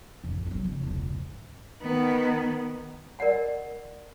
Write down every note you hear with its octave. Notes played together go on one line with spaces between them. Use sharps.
A1 F2
F#3 C4
C#2
E1 C#2
G#2
D#3 B3
A#4 D5 D#5 F#5 G#5